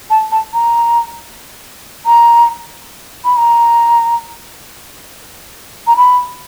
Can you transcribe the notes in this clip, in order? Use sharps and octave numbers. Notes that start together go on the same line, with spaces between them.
A5
A5
A#5
A#5
B5
A#5
A#5
B5